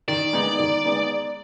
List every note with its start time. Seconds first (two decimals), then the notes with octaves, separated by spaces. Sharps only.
0.08 D#3 D5
0.33 G#3 B3 D#4
0.59 D#3
0.85 G#3 B3 D#4